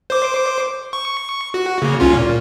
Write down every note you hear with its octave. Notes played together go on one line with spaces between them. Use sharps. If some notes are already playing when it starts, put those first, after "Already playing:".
C5 D6
C#6
F#4
C#3 A#3
C2 C#4 F4
A#2